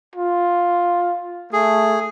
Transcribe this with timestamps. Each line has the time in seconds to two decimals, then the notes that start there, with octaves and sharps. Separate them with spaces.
0.15 F4
1.53 A3 G#4